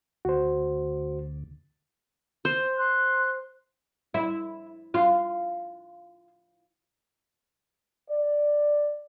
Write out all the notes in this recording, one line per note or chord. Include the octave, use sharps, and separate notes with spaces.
D2 F#4 C5
C5
C6 F#6
E4
F4
D5